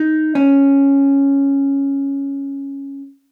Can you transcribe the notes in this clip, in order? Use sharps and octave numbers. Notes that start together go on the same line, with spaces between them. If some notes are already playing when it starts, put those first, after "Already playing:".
Already playing: D#4
C#4